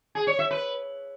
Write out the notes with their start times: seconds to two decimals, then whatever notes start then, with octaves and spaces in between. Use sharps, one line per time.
0.15 G#4
0.27 C#5
0.39 E5
0.51 B4